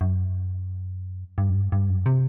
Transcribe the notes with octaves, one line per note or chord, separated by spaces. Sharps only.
F#2
G2
F#2
G2
G2
F#2
C3